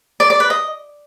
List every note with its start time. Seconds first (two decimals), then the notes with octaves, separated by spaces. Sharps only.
0.20 D5
0.30 D5
0.40 B4
0.50 D#5